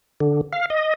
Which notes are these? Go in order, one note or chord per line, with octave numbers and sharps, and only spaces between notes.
D3
F5
D#5